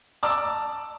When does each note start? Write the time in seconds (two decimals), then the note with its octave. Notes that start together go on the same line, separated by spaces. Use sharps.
0.23 D5 A5 A#5 D6 E6